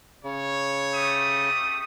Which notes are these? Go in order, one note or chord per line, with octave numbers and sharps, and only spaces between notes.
C#3 C#5
A3 G4 D#6